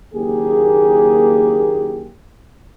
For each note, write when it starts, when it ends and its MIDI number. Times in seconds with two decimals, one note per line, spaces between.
0.14 2.11 30
0.14 2.11 39
0.14 2.11 58
0.14 2.11 67
0.14 2.11 68